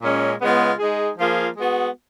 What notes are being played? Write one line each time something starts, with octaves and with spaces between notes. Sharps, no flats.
A#2 G#3 C#4
C#3 G#3 B3 F4
G#3 D#4 G#4
F3 A#3 F4 G#4
G#3 B3 F#4